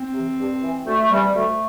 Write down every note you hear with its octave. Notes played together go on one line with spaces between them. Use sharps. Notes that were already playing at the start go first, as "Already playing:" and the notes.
Already playing: C4
C3 E3
G2
E3
D2 A3
C3 E3 G3
D2 A3